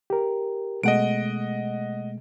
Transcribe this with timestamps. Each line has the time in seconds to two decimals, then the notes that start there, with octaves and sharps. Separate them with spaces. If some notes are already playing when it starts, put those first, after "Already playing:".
0.10 G4 A#4
0.83 B2 G#3 A3 D#5 F#5 D7